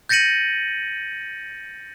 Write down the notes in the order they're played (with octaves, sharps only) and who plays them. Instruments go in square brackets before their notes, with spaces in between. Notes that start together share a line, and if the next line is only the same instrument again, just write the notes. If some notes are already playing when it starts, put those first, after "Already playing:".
[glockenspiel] G6 A6 A#6 C#7 D#7 F#7